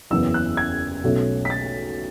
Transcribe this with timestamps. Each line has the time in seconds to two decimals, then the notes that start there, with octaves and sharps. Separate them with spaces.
0.11 F#1 E2 C#3 E3 B3 E6
0.34 F#6
0.57 G#6
1.04 B1 B2 A3 C#4
1.45 B6
1.50 A6